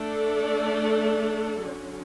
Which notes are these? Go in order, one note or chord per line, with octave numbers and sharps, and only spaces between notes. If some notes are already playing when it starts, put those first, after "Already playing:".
Already playing: A3 D4 A4 D5
D3 F#3 C#4